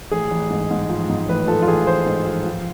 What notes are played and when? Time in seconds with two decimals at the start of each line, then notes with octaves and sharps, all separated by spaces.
0.11 A1 G#4
0.31 A1
0.50 G#2
0.71 G#2
0.90 F3
1.10 G#2
1.29 A1 B4
1.48 F3 A4
1.62 F4
1.67 A1 G#4
1.87 A1 C5
2.06 G#2
2.26 F3
2.45 F3